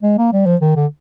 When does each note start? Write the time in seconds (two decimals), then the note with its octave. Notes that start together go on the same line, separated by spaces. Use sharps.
0.03 G#3
0.18 A#3
0.33 G3
0.46 F3
0.61 D#3
0.76 D3